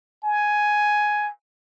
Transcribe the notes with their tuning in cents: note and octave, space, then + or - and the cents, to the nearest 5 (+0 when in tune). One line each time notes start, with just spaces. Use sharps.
G#5 +5